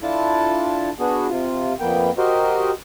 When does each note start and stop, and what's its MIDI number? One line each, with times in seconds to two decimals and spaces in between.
0.03 0.89 62
0.03 0.89 64
0.03 0.89 65
0.03 0.89 69
0.03 0.89 81
0.99 1.27 59
0.99 1.27 62
0.99 1.27 66
0.99 1.27 68
1.29 1.74 48
1.29 1.74 65
1.80 2.10 41
1.80 2.10 58
1.80 2.10 59
1.80 2.10 79
2.18 2.71 66
2.18 2.71 67
2.18 2.71 70
2.18 2.71 72
2.18 2.71 75